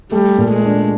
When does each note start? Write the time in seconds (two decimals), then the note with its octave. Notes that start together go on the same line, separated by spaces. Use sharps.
0.12 G3 A3
0.38 A#2
0.51 G#3
0.64 D4